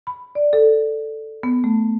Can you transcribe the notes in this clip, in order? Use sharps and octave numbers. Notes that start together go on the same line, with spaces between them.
B5
D5
A4
B3
A3